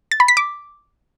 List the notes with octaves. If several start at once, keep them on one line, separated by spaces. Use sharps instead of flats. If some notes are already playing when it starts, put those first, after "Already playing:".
A6
B5
B6
D6